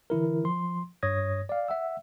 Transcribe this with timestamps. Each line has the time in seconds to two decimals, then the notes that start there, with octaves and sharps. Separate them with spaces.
0.10 D3 E3 E4 A#4
0.44 F3 C6
1.03 G2 C#5 D#6 G#6 A#6
1.49 D5 F5
1.68 E5 F#5 E6